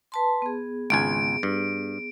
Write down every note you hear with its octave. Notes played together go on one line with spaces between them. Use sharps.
B4 A5 C6
B3 G#4
G#1 C#2 G#5 D7
G2